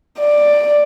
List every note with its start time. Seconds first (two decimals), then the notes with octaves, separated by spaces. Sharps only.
0.19 D5